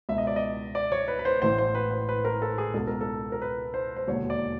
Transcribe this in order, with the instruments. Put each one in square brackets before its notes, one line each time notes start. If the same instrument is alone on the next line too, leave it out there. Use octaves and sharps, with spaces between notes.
[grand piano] C#2 B2 E5
D#5
D5
D#5
D5
C#5
B4
B4
C5
A1 A2 E3 C5
C5
B4
C5
B4
A#4
A4
G#4
C#2 B2 A4
A#4
A4
A#4
B4
C5
C5
E1 D#2 D3 C#5
D5